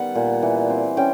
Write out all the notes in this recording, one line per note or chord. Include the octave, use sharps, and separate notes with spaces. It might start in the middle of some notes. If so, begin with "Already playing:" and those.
Already playing: D#3 G3 B3 F#5
A#2
E3
C4
C#4 G5